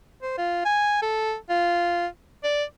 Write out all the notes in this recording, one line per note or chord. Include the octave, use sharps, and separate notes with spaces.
C5
F4
G#5
A4
F4
D5